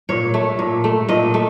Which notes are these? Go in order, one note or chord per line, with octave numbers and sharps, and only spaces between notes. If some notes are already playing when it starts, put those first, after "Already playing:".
A#2 C#5
A3
A#2
A3
A#2 D#5
A3